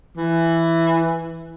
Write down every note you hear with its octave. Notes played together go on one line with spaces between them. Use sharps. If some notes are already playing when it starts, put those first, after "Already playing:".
E3